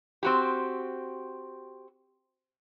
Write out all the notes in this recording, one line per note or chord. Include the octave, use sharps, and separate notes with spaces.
C4 F#4 G4